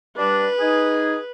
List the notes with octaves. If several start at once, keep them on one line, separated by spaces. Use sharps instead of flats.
G3 D4 B4
D#4 G#4